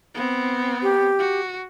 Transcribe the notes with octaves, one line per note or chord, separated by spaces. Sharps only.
B3 C4
G4
F#4